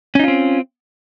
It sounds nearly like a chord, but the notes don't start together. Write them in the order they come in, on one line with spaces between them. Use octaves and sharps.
C#4 D#4 F4 C4